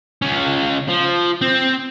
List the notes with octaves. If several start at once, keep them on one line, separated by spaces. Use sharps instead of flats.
C#2 C#4
F3
C4